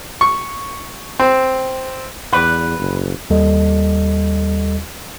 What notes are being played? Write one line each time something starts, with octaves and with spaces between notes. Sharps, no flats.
C#6
C4
E2 B4 D5 F#5
F#1
D#2 G3 A4 D#5